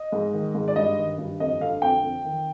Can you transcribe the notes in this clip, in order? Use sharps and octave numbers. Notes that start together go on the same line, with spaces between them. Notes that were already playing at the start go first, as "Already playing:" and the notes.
Already playing: D#5
G#2
D#3
G#2
D5
G2 D#5
D#3
G2
F2 D#5
D3 F5
F2 G5
F2
D#3